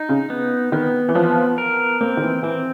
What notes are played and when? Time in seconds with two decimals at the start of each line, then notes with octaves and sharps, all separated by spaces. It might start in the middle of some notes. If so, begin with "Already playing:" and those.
Already playing: D#4
0.09 C#3
0.30 B3
0.72 D#3 B3
1.09 E3
1.15 F3 B3
1.58 A#4
2.01 A#3 C4
2.17 D#3
2.22 E3
2.43 E3 C4